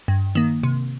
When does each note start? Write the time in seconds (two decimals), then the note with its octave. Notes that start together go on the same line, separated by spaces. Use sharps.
0.08 G2
0.35 D#3 A#3
0.63 C3